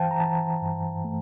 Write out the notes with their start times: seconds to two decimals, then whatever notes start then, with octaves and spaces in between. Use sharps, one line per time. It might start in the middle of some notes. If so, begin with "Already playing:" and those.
Already playing: G2 E3 C5 F5 G5 A5
0.11 A#5
0.20 E3 A5
0.62 G2
1.04 A3